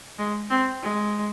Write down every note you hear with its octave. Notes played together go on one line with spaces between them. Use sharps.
G#3
C4
G#3